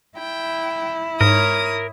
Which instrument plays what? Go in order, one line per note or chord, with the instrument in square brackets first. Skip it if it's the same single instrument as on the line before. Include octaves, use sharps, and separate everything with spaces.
[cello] E4 [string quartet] G5
[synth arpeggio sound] G#2 [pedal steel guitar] A#4 [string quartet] C#5 D#6